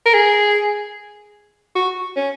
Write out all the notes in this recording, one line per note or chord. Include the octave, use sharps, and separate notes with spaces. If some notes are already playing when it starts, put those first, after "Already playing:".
A#4
G#4
F#4
C#4